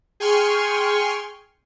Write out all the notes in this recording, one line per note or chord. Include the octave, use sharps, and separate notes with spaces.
G#4 G5 G#5 C6 C#6 F6